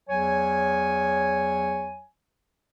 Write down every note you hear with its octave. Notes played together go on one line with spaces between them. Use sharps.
E2 F#3 C#5 G#5